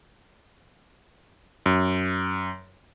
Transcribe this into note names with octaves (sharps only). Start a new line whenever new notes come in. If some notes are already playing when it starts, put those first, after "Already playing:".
F#2